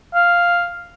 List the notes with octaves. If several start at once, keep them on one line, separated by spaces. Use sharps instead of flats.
F5